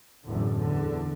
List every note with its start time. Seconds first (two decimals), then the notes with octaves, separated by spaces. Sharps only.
0.23 F#1 E2 A2 D3
0.51 E2 D3